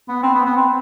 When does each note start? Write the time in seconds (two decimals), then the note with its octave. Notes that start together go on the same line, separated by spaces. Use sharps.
0.09 B3
0.23 C4
0.35 B3
0.46 B3
0.57 C4